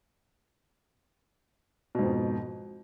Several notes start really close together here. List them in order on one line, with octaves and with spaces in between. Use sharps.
B2 G#2 F2